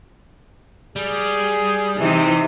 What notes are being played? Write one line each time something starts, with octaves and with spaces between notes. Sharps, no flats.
G3 G#4
C3 E3 C4 D#4